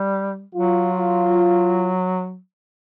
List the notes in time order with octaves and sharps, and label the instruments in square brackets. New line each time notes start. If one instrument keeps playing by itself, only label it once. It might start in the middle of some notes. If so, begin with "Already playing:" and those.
Already playing: [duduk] G3
[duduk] F#3 [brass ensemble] F4